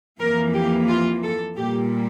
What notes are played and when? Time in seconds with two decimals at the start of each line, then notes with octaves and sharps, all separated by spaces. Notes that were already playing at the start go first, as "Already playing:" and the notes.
0.20 F2 E3 A#3 A#4
0.54 G4
0.88 F4
1.24 A4
1.57 A#2 G3 A#3 G4